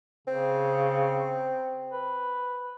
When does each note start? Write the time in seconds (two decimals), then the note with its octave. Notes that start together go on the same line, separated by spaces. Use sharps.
0.27 C#3 C4
1.92 B4